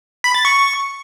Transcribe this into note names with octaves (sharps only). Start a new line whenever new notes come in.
B5
A6
C#6